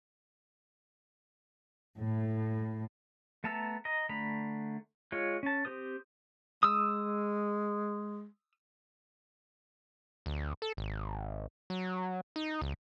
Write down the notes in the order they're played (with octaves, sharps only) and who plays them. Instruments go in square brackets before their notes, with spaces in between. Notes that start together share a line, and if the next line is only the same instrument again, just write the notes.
[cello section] A2
[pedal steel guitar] A3 B3 A5 A#5 E6
D#5 A#5
D3 A3 A#5 B5
G#3 F4 C#5
C#4 A5
C4 G4 C5 D#6
[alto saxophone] G#3 [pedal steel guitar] D#6 E6
[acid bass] D2
A4
G#1
F#3
D#4
C#2